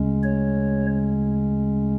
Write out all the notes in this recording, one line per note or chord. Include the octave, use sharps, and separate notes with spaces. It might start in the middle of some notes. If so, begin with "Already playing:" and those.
Already playing: D2 C#3 G#3 C#4
C#5